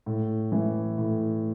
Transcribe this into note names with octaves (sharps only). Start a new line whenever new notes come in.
A2
E3
A2